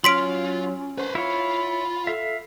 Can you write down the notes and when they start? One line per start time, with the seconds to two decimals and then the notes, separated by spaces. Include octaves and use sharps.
0.04 F#3 C#4 F4 C#5 C6 F6 B6 D7
0.98 B4 C5
1.15 E4 F4 C#5 B5
2.07 A4 E5 F5